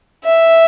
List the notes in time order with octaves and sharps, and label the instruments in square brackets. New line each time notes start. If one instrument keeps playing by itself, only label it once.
[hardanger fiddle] E5